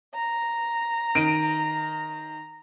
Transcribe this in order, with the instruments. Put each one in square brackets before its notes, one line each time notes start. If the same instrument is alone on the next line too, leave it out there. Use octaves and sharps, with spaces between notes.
[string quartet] A#5
[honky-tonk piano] D#3 D7 D#7